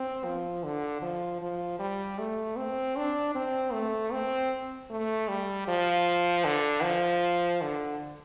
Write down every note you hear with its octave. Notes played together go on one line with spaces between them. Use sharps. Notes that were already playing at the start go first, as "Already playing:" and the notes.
Already playing: C4
F3
D3
F3
F3
G3
A3
C4
D4
C4
A3
C4
A3
G3
F3
D3
F3
D3